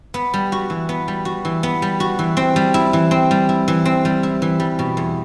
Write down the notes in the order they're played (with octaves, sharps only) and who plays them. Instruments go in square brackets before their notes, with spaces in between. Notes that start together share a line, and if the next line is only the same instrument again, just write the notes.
[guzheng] B3
G3
F#4
E3
B3
G3
F#4
E3
B3
G3
F#4
E3
C4
G3
E4
E3
C4
G3
E4
E3
C4
G3
E4
E3
G3
B2
E2